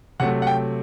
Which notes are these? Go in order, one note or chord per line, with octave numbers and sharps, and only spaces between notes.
C3 F#3 A3 F#5
F#5
G5